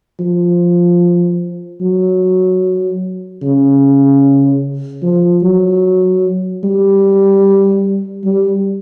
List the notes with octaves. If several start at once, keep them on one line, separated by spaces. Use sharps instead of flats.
F3
F#3
C#3
F3
F#3
G3
G3